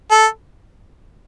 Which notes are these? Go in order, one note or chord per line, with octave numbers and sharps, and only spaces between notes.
A4